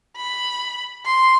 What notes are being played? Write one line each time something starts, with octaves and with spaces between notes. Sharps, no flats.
B5
C6